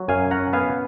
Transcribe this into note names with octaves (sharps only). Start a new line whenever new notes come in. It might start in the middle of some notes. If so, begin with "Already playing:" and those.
Already playing: F#3
F#2 F5 G#5
C#4 F#5 A#5
B3 F5 G#5